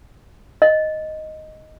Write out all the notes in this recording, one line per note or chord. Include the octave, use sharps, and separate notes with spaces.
D#5